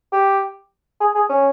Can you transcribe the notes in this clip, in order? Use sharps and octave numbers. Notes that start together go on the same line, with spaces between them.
G4
G#4
G#4
C#4